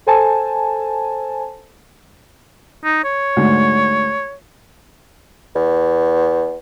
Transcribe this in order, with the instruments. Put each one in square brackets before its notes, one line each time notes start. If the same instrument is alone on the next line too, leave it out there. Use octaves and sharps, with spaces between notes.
[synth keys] A4 C5 G#5 A5
[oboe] D#4
C#5
[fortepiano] D2 G#2
[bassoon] E2